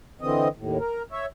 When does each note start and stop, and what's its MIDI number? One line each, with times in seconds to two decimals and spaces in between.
0.21 0.48 50
0.21 0.48 52
0.21 0.48 60
0.21 0.48 75
0.57 0.78 39
0.57 0.78 45
0.79 1.02 70
1.12 1.26 73
1.12 1.26 76